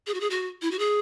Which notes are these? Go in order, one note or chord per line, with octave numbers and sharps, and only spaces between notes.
G#4
F#4
G#4
F#4
E4
F#4
G#4